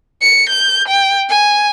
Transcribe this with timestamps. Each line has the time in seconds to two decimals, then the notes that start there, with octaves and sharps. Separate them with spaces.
0.21 C#7
0.49 G6
0.88 G5
1.29 G#5